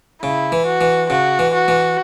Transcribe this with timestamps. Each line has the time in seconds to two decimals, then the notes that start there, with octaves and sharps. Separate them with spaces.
0.23 C#3 E4
0.52 E3
0.66 F#4
0.81 E3
1.10 C#3 F#4
1.39 E3
1.54 F#4
1.68 E3